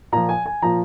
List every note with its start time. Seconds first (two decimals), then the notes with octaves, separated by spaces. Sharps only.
0.12 A#2 F3 A#5
0.29 G#5
0.46 G#5
0.62 A#2 F3 A#5